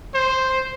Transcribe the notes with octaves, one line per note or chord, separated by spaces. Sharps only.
C5